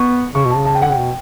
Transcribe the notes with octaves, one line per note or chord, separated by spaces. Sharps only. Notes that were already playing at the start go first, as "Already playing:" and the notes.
Already playing: B3 C#6
C#3 C#6
B2
A5
C#3
A5
G5
D3 F#5
C#3 G5
B2